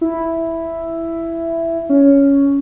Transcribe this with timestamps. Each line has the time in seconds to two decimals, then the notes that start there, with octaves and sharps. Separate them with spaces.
0.01 E4
1.89 C#4